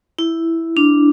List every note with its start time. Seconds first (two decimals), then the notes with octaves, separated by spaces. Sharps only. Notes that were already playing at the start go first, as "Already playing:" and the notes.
0.19 E4
0.77 D4